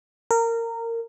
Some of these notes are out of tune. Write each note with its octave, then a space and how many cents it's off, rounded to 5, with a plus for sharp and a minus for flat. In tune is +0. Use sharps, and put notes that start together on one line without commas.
A#4 -20